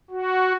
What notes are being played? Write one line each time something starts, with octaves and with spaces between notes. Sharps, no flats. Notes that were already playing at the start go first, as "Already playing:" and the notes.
F#4